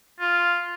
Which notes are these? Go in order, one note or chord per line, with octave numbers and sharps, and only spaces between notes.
F4